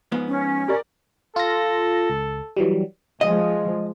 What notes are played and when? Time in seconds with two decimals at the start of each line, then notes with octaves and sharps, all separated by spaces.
0.12 G#2 F3 B3
0.27 C#4
0.68 G4 A#4 D5
1.36 F4 A4 A#6
2.10 C#2
2.57 E3 F#3 G3
3.21 F3 G#3 D#5